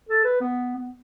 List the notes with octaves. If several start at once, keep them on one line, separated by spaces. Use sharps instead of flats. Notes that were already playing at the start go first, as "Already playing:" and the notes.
A4
B4
B3
B3